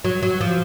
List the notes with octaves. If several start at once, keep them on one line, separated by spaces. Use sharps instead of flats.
F#3
F#3
F3